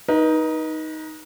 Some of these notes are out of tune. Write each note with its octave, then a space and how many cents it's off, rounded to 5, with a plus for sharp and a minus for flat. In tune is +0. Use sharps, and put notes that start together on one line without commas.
D#4 +10 B4 -35